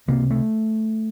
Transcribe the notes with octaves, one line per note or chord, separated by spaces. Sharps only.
C#2 C3 A#3
A3